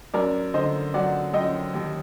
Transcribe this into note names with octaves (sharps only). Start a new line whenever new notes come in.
F#2 A#4 D5
D3 C5 D#5
F#3 D5 F#5
F#2 D#5 G5
D#2